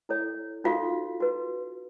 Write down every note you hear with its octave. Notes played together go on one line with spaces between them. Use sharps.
E4 A4 C#5
D#4 F4 F#4 A4 F5
F#4 B4